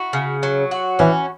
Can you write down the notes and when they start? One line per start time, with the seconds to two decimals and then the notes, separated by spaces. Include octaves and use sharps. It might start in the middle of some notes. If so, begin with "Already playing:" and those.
Already playing: E4 F#4
0.13 C#3
0.43 F#3
0.71 F#4
0.99 E3 C#4